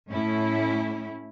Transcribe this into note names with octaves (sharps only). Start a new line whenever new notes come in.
A2 C#4 E4